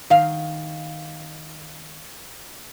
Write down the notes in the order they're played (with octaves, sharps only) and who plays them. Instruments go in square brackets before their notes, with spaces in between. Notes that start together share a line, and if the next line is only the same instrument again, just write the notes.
[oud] D#3 F5